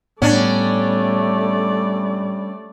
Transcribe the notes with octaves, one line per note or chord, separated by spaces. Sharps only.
A2 G3 A3 B3 C#4 D4 D5